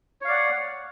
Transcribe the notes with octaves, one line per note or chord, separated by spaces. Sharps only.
C#5 D5 F5 F#5